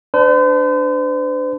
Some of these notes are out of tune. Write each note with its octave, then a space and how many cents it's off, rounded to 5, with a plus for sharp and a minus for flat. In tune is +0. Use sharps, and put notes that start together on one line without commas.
D4 +0 C5 -45